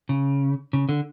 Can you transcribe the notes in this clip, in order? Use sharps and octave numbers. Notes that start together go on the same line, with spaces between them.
C#3
C#3
D3